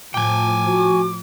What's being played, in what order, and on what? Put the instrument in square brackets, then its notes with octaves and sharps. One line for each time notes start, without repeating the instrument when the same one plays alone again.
[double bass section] A2 F3 [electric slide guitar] G5 G#5 [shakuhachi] D6
[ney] F#4